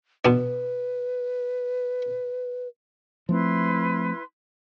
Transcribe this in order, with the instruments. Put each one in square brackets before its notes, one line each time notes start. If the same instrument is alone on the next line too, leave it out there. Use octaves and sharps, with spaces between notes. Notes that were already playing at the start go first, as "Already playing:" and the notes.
[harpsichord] B2 D4 [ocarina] B4
[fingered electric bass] F3 A3 C4 [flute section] E4 B4 C6